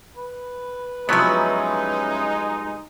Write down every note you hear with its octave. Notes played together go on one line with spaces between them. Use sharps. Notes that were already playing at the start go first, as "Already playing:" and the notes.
B4
G2 F3 F#3 G#3 B3 C#4 D#4 E4